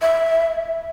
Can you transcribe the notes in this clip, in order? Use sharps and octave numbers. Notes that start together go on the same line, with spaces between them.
E5